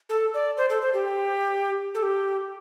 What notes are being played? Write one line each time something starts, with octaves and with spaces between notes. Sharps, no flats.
A4
D5
C5
A4
C5
G4
A4
G4